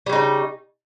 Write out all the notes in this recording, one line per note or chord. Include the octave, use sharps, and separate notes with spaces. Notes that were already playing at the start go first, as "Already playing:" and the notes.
C#3 G3 D#4